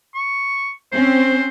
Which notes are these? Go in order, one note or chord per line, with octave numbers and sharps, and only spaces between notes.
C#6
C4 C#4 C5